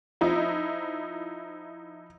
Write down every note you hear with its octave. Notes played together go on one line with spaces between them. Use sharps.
F3 D#4 E4